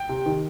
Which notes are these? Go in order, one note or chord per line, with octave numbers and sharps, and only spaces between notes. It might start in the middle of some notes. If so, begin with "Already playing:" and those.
Already playing: G5
C3
D#3